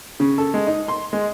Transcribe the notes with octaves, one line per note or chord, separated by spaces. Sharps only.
C#3
A4
G#3
D#4
C6
G#3